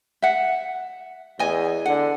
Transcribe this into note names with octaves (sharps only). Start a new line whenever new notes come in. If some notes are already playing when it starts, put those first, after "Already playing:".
E5 F#5
E2 D#5 G#5
D3 F#5